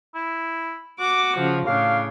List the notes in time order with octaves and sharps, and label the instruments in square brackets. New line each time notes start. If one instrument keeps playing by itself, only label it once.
[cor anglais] E4
[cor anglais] F#4 [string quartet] D6
[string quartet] C#3 F3
[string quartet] A2 C#3 [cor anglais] D4 [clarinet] F5